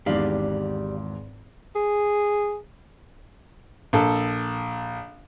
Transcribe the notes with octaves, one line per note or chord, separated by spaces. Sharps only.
G#1 E2 G#2 G4 D5 F5
G#4
A#1 A4